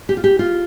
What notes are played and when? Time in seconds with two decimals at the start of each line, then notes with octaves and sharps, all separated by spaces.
0.09 G4
0.17 F4
0.24 G4
0.39 F4